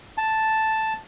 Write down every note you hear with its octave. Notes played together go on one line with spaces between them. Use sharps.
A5